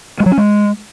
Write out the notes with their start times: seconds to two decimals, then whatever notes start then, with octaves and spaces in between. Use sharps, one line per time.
0.20 G#3
0.26 F#3
0.32 C#4
0.37 G#3